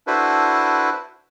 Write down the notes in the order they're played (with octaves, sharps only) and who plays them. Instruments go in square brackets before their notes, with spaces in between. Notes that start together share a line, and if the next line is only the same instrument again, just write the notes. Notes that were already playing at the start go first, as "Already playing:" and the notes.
[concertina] D4 E4 F#4 A4 B4 C5